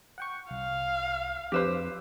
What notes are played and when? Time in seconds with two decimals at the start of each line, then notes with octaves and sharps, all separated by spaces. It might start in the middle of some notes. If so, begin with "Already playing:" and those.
0.18 F#5 G5 C#6
0.51 C2 F5
1.52 F2 G4 B4 C5 E6